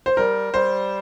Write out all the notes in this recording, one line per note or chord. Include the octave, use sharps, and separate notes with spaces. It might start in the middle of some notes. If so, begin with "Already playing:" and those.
C5
G3 A#4
G3 C5